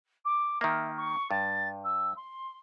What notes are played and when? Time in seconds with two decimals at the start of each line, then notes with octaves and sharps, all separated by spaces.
0.25 D6
0.61 D#3 A#3 E5
0.96 C#6
1.31 G2 A6
1.84 E6
2.16 C6